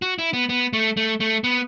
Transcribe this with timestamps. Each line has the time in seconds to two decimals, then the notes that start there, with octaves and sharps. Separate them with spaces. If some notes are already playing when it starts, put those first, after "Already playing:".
0.02 F#4
0.19 E4
0.33 B3
0.49 B3
0.73 A3
0.97 A3
1.20 A3
1.44 B3